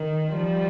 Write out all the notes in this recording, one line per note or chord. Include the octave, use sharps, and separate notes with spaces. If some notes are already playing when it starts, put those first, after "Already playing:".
Already playing: D#3
F3 G3